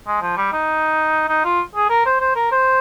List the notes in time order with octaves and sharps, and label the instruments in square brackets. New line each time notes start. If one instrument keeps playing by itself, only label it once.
[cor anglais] G#3
F3
G3
D#4
D#4
F4
G#4
A#4
C5
C5
A#4
C5